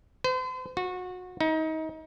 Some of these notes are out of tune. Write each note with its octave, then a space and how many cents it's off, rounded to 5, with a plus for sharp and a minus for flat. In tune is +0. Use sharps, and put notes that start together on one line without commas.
C5 -40
F#4 -25
D#4 +30